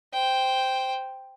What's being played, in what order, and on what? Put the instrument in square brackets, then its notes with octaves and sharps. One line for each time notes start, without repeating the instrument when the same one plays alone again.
[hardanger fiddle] C5 G5